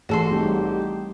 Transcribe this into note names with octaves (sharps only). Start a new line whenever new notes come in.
A1 F#4 G#4 A4 C6
G3 C4 D#4 G4